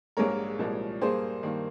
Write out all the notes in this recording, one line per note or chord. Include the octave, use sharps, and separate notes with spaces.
A#1 G#2 G3 A#3 A#4 C#5
C2 A#2 F3 G#3
G2 G3 A#3 G#4 C5
G2 D#3 A#3